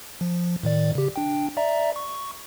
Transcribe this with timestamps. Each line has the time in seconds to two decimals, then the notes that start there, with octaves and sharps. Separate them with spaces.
0.21 F3
0.63 A2 D#3 D5
0.95 C#3 G4
1.16 D4 G5
1.57 D5 E5 A#5
1.96 C#6